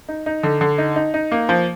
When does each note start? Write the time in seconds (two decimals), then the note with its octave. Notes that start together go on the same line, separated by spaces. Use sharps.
0.08 D#4
0.26 D#4
0.43 D3
0.61 D3
0.78 D#4
0.96 D#4
1.14 D#4
1.32 A#3
1.49 F3